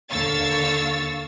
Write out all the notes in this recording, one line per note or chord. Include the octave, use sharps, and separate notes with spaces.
D#2 D3 F5 C#6 E6 A6